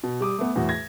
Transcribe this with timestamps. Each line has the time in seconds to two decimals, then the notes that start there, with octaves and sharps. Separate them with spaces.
0.03 B2
0.21 G3 D6 D#6
0.38 A3 B3
0.55 E2 A2 F#4
0.69 G#6 A#6